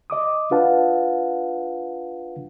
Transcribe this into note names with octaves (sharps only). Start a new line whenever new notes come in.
D#5 D6 D#6
D4 F4 B4 F5 F#5 A5